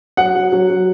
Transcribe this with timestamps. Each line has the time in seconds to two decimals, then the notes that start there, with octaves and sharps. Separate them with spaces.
0.17 F#3 F#5
0.35 F#3
0.52 F#3
0.70 F#3